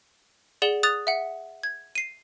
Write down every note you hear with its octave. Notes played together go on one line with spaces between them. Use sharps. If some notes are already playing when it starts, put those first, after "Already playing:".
G#4 D5 F#5 E7 G7
D#6 F#6 A6 F7
E5 F#5
G#6
C7 D#7